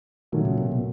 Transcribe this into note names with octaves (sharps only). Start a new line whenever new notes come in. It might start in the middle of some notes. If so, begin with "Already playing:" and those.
A#2 D#3 F#3 A3
C#3
C3
B2